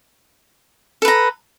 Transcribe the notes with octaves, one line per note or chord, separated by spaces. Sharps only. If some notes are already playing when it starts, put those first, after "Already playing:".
A4 B4 A#5